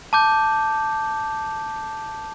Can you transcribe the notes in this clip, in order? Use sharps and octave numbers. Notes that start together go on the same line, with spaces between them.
A5 D6 G6